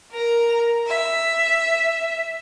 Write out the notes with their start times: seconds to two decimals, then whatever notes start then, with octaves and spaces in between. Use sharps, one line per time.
0.12 A#4 A#5
0.87 E5